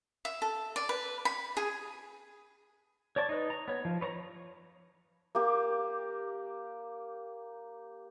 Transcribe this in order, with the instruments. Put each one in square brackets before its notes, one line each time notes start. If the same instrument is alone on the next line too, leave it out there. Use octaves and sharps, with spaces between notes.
[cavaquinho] E5
A4
D5
B4
B5
G#4
[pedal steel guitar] C#5 D5 A5 C#6
D#4 B4
A#5
B3 C#5
F3
B4 C#5 A5 A#5
[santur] A#3 G4